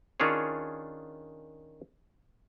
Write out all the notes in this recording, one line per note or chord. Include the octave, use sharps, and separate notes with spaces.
D#3 C#4 D4 F4 G#4 C#5